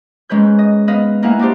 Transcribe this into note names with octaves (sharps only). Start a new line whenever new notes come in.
G#2 G#3 C#4 B4 G6
D#5
B3 B4 D#5 F5
A#3 D#4 E4 F5 F#5 G#5
D4 D#4 F#4 G4 C5